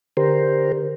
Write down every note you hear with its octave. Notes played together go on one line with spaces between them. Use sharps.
D3 G4 A#4 C5